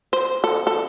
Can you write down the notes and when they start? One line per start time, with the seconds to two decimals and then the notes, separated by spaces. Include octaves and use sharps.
0.13 C5
0.44 A4
0.67 A4